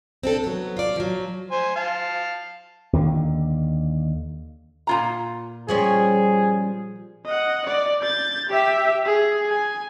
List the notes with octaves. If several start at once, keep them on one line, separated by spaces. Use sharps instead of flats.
C4 D4 A4
F#3 B3
F4 D5
F3 F#3
C5 G#5
F5 A5
D#2 D3
A#2 F4 A#5
F3 G3 C#4 G#4
D#5 F#5
D5
G6 A6
G4 E5
G#4
G#5